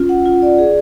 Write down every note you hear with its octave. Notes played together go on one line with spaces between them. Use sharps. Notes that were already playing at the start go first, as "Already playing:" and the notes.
Already playing: C#4 F4
F#5
F4
D5
G#4